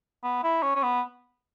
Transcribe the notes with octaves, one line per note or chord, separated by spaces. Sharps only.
B3
E4
C#4
C#4
B3